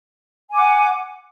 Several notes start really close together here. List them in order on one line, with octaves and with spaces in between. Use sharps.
G#5 D6 F#5